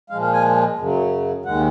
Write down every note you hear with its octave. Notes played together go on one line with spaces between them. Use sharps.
A#2 F3 G#3 F5
F5
G#5
F#2 C#3 F#3
D#2 D#3 G#3 F#5